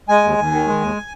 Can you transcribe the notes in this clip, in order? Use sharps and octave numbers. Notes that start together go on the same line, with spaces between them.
G#3 G#5
D#2
D#2
D#3
G#3
D#2